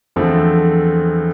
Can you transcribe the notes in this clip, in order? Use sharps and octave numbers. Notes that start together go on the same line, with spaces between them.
E2 D3 F3 A3 C4